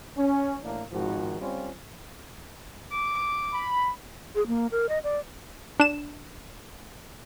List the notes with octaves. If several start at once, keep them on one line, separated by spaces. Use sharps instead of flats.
C#4
A1 A2 A#3 D4
G#1 G#2 D#3 F3 F#4
G3 C4 C#4 F4
D6
B5
G#4
A#3
A#4
D#5
D5
D4 E7